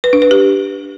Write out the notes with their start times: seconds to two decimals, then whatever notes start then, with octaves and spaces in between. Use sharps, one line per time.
0.04 B4
0.13 D4
0.22 B4
0.31 G4